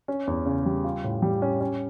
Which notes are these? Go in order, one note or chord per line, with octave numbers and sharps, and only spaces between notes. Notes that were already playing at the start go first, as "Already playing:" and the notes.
C#4
E2
C#3
G3
F4
A2
G3
C#4
C#4